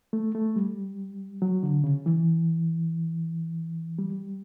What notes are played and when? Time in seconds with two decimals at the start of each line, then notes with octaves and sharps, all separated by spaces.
0.13 A3
0.35 A3
0.56 G3
1.42 F#3
1.63 D3
1.84 C#3
2.06 E3
3.99 G3